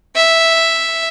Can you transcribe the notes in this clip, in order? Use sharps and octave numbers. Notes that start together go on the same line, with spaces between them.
E5